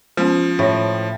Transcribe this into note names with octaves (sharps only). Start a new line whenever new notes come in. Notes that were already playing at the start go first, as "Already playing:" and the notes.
F3 G#3 B3 C#4
A2 G4 C#5